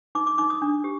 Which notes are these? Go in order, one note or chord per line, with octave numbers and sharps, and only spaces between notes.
D#4 D6
D6
D#4 D6
D#6
D4
G4